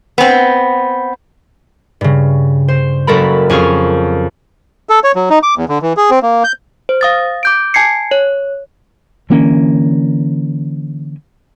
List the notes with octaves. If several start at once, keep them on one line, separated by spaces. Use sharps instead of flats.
B3 C4
G2 C#3
C5
F#1 F#4 A4 A#4 B5
F2 C#4 G#4 C#6 F6
A4
C#5
F#3
D#4
D6
E2
D3
E3
G#4
C4
A#3
G6
C5
F5 D#6 A6
D6 G6 D7
G#5 A5 G#6 C7 C#7
C#5
D3 E3 A#3 C#4